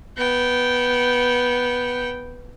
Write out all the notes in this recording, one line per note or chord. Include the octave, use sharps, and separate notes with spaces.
B3 G5